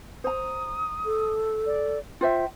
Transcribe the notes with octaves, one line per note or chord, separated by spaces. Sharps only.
C5 A#5 D#6
A4
D5
F4 C5 E5 G5